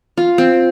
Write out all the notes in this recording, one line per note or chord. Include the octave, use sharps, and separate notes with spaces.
F4
C4